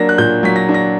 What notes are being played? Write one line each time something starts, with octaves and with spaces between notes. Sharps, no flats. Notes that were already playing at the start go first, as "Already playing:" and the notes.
Already playing: F#3 A#3 D4 A#6
F#6
A#2 G6
F#3 B6
A#6
D4
A#6